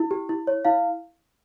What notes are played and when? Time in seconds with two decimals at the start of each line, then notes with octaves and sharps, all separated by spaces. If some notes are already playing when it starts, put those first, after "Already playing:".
Already playing: E4
0.11 G4
0.29 E4
0.47 C#5
0.65 E4 F5